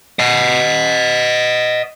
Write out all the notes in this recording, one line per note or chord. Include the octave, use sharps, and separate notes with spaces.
D#5 F#5